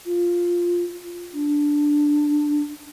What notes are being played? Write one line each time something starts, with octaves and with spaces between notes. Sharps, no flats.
F4
D4